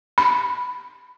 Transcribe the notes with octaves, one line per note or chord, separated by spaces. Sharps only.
B5